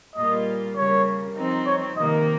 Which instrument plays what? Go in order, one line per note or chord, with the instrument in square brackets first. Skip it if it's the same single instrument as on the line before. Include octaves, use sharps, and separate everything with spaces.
[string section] A#2 G3 A#3 F4 [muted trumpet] D#5
[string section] C#3 G3 A#3 [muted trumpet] C#5
[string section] F3 C4 D#4
[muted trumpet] C#5
[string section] C3 D#3 A#3 [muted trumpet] D#5